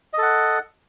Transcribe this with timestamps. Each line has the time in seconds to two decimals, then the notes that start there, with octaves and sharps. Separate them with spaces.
0.13 D#5
0.18 A4
0.22 F#5